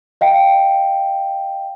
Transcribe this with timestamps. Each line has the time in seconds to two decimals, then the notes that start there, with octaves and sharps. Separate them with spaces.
0.21 D#5 F5 G5